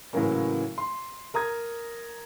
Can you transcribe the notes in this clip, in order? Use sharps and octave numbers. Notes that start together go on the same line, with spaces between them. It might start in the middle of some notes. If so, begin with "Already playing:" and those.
A2 C#3 E3 F#3 A#3 C#4
C6
A#4 A#5 D#6 G#6